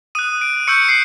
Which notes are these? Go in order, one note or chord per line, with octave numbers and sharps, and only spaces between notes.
D#6 F#6 D#7
D7
C#6 E6 G6 C#7
C7